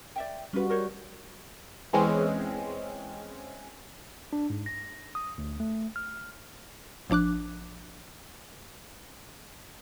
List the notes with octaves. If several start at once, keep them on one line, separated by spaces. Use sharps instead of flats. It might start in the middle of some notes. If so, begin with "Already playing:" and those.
D5 E5 G5
G3 C#4 F4 F#4 B4
A#4 C5 C#5
E2 E3 G#3 C4 C#4
D4
G#2
A#6
D#6
D2
A3
F6
A1 F3 D4 D6 F#6